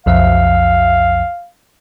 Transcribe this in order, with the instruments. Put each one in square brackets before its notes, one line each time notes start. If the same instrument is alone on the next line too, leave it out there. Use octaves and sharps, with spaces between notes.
[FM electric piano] B1 F2 E5 [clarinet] F5